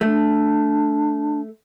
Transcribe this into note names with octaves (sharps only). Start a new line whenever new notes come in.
A3 D4